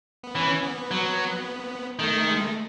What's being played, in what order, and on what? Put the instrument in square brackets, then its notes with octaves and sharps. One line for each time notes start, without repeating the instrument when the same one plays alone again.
[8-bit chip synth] B3
[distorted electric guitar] E3 [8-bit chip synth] C#4
[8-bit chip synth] B3
[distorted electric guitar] F#3
[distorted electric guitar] D#3 [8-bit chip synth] A3
[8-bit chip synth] A3
G#3
A3